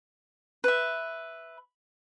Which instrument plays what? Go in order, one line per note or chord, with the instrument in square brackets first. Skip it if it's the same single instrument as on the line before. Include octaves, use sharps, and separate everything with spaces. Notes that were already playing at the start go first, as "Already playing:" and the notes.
[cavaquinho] B4 E5